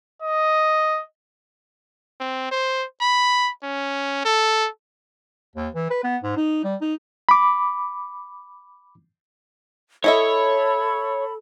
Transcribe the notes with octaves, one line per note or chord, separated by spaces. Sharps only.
D#5
C4
C5
B5
C#4
A4
D#2
E3
B4
B3
G#2
D#4
G3
D#4
B5 D6
E4 A4 C#5 D#5 E5 B5